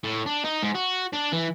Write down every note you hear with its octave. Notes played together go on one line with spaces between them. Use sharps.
A2
D4
D#4
G#2
F#4
D4
E3